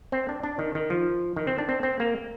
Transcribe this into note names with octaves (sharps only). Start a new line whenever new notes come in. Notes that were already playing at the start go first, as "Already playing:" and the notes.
C4
D4
D4
D#3
D#3
F3
D#3
C4
D4
C4
C4
A#3